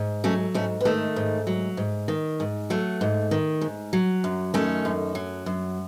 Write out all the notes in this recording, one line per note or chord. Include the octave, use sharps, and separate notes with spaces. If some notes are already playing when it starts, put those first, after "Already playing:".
Already playing: G#2
F#3 A3 C#4
G#2 A3 C#4
B3
D#3 A3
G#2
F#3
G#2
D#3
G#2
F#3 A3
G#2
D#3
G#2
F#3
F#2
D#3 A3 C#4
F#2
F#3
F#2